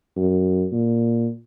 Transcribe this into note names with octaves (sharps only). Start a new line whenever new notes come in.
F#2
A#2